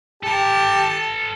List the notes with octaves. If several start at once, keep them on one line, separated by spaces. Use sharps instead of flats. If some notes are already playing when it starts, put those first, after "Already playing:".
G4 A4 A5 A#5